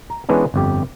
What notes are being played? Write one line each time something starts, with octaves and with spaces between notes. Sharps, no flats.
A#5
E3 G#3 B3 C#4 D4
G1 F2 G4